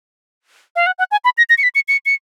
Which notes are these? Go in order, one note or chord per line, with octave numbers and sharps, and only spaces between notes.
F5
F#5
F#5
G#5
B5
A#6
A#6
C#7
B6
C#7
C#7
C#7